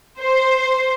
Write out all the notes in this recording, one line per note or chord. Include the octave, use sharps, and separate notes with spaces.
C5